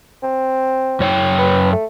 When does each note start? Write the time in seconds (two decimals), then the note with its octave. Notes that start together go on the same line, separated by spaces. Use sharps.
0.23 C4
1.00 F#2 C#5 G5
1.38 B4
1.73 A3